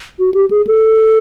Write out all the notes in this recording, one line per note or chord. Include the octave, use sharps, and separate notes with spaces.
F#4
G4
G#4
A4